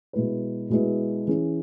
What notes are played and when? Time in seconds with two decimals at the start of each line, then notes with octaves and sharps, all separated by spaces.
0.13 B2 G#3 E4 B4
0.70 B2 G#3 E4 B4
1.27 E3 C#4 E4 G#4